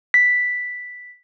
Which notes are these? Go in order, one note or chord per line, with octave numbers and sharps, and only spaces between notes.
B6